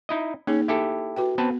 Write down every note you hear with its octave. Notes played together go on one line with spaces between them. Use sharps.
D#4 E4 D#5
A#3 C#4 D#4 G#4
E4 G4 A4
F#4 B4 G5
B3 C4 B4 A5